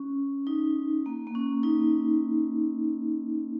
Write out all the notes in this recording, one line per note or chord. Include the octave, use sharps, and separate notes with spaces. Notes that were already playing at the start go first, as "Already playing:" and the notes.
Already playing: C#4
D#4
A#3
A#3
C#4
D#4